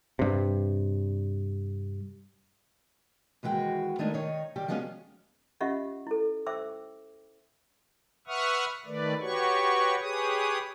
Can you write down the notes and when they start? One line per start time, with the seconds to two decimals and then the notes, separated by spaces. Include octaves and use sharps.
0.19 G2 C3
3.43 D#2 E3 G#3 F#4 G5
3.99 D#3 G#3 A3 D4 D#4 A#4
4.14 D#3 D#4 C#5
4.56 D#3 G3 G4
4.68 F3 F#3 G#3 B3 C#4
5.61 C#4 F4 G4 D#5 E5 F#5
6.07 E4 A4
6.46 C5 E5 G5 D6 E6
8.27 B4 E5 F#5 C#6 D#6 F6
8.86 D#3 A3 B4 D5
9.21 F#4 G4 B4 C#5 C#6
10.01 G4 G#4 B4 C#5 D#6